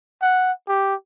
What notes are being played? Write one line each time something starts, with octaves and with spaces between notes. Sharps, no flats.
F#5
G4